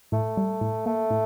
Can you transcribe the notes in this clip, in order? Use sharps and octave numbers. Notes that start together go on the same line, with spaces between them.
A2 A3
G3
A2
A3 A#3
A2